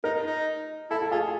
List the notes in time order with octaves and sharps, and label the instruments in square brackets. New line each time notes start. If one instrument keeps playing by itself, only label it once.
[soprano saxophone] D#4 [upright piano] A#4
[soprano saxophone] D#4
[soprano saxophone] E4 [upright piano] A4
[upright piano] A4
[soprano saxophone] F4 [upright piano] G#4